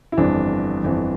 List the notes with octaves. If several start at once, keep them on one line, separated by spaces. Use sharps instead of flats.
E4
G1 F2 E3 D4
G1 F2 E3